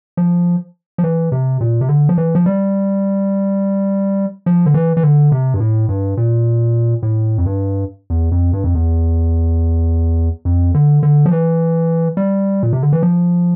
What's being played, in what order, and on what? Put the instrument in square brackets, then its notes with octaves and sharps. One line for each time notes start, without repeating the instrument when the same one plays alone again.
[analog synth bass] F3
F3
E3
C3
A#2
C3
D3
F3
E3
F3
G3
F3
D3
E3
E3
D3
C3
G2
A2
G2
A#2
A2
F2
G2
E2
F2
G2
F2
E2
F2
D3
D3
F3
E3
G3
A#2
C3
D3
E3
F3